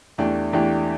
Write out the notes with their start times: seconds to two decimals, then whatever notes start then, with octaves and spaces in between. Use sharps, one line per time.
0.18 E2 E3 A3 D4 G4
0.53 E2 E3 A3 D4 G4